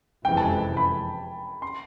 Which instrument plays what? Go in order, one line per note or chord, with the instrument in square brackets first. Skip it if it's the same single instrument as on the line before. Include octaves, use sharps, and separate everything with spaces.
[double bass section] F#1 F2 C3 E3 G#3 [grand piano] G5
[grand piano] A5
G#5
B5
C6